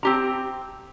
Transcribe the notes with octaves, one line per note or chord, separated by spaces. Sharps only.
C4 G4 A#5